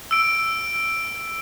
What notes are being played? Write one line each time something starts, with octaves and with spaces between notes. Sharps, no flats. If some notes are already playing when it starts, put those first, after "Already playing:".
E6 D7